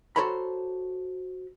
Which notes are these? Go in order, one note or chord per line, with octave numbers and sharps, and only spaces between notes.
F#4 A4 C5 C#5 A#5 B5